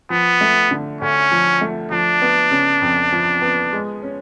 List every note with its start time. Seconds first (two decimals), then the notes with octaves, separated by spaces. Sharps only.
0.10 F3 B3
0.41 A3
0.71 D3
1.01 D2 C#4
1.32 F3
1.61 A3
1.91 F3 D4
2.22 B3
2.51 C#3
2.82 F2
3.12 F3
3.42 B3
3.73 G#3
4.02 C#4